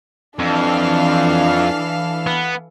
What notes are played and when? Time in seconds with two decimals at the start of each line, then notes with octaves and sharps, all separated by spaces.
0.39 F2 E3 D4 A4 F5
2.27 B3